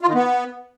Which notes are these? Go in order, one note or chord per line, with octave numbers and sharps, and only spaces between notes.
F4
D#3
B3